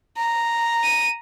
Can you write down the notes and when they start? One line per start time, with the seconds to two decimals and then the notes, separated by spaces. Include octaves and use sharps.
0.17 A#5
0.84 D#7